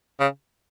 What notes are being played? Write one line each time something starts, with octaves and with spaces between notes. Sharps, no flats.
C#3